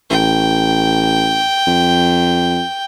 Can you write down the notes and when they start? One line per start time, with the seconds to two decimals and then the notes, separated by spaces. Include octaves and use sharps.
0.10 A1 G5
1.67 F2